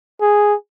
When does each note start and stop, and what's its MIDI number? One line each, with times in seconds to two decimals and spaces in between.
0.21 0.55 68